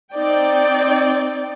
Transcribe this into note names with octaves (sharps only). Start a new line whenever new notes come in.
C4 D#4 D5 G5